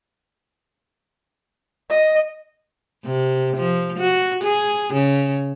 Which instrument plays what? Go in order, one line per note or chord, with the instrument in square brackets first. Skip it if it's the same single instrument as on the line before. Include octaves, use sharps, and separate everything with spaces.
[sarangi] D#5
[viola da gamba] C3
F3
F#4
G#4
C#3